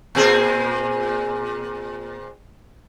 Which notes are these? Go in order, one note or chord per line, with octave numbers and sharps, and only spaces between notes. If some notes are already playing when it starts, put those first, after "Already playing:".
A#2 C4 G#4